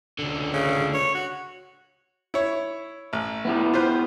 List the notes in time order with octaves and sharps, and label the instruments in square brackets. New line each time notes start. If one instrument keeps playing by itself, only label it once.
[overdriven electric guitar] C#2 D3
[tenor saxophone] C#3
C#5
F#4
[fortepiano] E4 C#5
A1
[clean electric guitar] B3 E4 G4
[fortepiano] F4 B4 C5